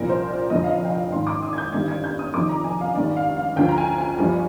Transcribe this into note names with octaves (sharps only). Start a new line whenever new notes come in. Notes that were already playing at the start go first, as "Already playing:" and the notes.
Already playing: C2 A#2 F3 A#4
C5
D5
F1 F2 D3 F3 D#5
F5
D#5
G5
F5
G#1 G#2 D#3 C6
D6
D#6
G#6
G6
G1 G2 D#3 G#6
G#6
G6
D#6
F1 F2 D#3 D6
A#5
G#5
F5
G#1 G2 D#3 D5
F5
F5
D2 D3 F3 G5
A#5
G#5
G#5
G1 G2 F3